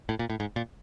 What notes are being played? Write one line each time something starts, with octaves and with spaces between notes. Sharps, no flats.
A2
A#2
A2
G#2
A#2